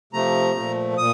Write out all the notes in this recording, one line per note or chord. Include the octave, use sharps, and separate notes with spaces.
C3 F3 A3 A#5
A#2 F3 A3
A#2 D#6